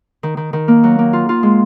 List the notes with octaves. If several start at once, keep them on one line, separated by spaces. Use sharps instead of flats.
D#3
D#3
D#3
A#3
F#3
A#3
F4
F4
G#3